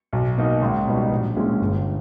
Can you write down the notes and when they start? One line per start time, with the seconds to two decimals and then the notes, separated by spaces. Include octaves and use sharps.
0.13 B1
0.37 B2 A#3 D#4
0.62 C#2
0.87 B2 G3 B3 D#4
1.12 A#1
1.36 A#2 G#3 C#4 E4
1.61 G1